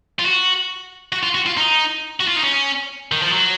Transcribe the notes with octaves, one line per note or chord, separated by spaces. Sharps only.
F4
F#4
F#4
F4
F#4
F4
D#4
F#4
F4
D#4
C#4
D#3
F3
F#3